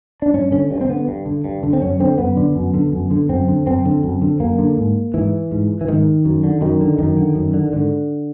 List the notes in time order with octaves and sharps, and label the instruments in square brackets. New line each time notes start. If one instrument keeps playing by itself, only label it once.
[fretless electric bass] D4
G2 C#4
D3 C#4
G2
C4
D3 B3
G2
D3
G2
D3
C4
F#2 C#4
D3 C4
F#2 B3
D3
F#2
D3
F#2
D3
F#2 C4
D3
F#2 C4
D3
F#2
D3
F#2 A#3
D3
G#2
G#2 E3
G#2
E3
G#2 D#3
F#2
D3
F#2 D#3
D3
F#2 D#3
D3
F#2
D3
G#2 D3